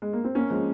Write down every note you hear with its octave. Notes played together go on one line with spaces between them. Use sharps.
G#3
A#3
C4
A#3 C#4
F3 G#3